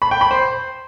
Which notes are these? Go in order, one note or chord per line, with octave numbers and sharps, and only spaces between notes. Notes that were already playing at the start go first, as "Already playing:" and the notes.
B5
G5
B5
C5